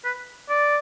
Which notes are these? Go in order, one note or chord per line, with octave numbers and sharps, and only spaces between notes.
B4
D5